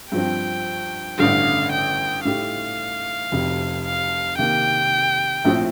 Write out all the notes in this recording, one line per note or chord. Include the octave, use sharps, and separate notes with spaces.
G2 F3 C4 G5
A1 G2 D3 G3 F5
G5
A2 A3 D#4 G4 F5
F1 F2 C3
F5
C3 D#3 A#3 G5
A#1 A2 F3 C4